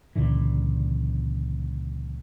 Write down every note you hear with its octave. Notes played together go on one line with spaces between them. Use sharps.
C#2 A#2 D3 E3